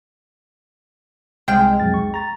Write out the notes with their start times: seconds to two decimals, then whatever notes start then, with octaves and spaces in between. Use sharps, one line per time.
1.48 C2 G#3 C4 G5 F6
1.80 B1 F2 A6
1.94 C#6
2.14 A#5 A6